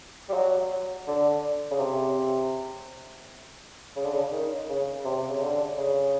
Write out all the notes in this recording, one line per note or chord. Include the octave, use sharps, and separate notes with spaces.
G3
F#3
D3
C#3
C3
C#3
D3
C#3
D#3
C#3
C3
C#3
D3
C#3